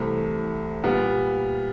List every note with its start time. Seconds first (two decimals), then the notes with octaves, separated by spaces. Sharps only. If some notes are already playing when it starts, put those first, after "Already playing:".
Already playing: C2 C3 E3 A3
0.84 A#2 G3 B3